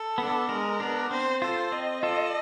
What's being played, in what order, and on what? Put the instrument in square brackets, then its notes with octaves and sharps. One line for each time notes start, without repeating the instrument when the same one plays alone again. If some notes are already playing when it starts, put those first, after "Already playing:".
Already playing: [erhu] A4
[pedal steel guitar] B3 D4
[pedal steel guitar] G#3 [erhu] A#4
[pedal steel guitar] B3 D4
[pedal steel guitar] C4 [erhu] C5
[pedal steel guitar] F4 A4 [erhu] C5
[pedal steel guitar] C4 [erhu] D#5
[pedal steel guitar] F4 A4